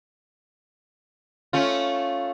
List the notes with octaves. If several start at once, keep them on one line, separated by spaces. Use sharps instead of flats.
A3 C#4 F4